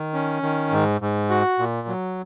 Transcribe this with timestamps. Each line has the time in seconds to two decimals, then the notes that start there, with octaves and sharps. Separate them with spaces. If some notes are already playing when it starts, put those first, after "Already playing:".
Already playing: D#3
0.14 C#4
0.43 D#3
0.71 G#2
1.01 G#2
1.30 F#4
1.59 A#2
1.88 F#3